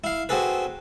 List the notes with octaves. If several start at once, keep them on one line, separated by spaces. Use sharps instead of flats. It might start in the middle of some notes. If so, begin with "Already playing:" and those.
E4 F5
C4 F#4 G#4 A4 B4